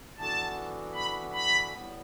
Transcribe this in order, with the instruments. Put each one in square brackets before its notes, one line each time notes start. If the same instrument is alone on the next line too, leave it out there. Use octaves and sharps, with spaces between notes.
[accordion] E3 B3 D4 F#4 A4 [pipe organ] A5
[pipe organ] B5
B5
[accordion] A2 G3 B3